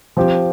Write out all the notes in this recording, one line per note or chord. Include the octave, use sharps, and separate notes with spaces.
F3 C4 G4